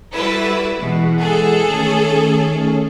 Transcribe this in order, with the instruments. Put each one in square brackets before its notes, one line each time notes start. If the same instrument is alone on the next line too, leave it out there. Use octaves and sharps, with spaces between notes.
[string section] G3 E4 B4 [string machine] F#4 A4 A5
[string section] B2 [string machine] E3 G#3 F#5
[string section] G#4 A4
[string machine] D#3 A3 C#4